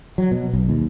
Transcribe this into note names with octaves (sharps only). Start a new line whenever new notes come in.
F#3
B2
B1
D#2